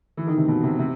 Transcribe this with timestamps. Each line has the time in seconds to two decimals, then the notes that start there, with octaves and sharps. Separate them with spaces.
0.17 E3
0.27 D#3
0.37 C3
0.48 B2
0.64 C3
0.79 C3